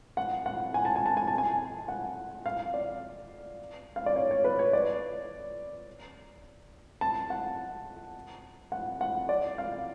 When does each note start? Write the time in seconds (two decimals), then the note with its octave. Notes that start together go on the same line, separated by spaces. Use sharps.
0.17 F#5
0.46 F#5
0.74 G#5
0.85 A5
0.96 G#5
1.06 A5
1.17 G#5
1.27 A5
1.38 G#5
1.88 F#5
2.46 F5
2.74 D5
3.96 F5
4.06 D5
4.16 C#5
4.31 C#5
4.44 B4
4.59 C#5
4.73 D5
7.01 A5
7.30 F#5
8.72 F#5
9.01 F#5
9.29 D5
9.58 F5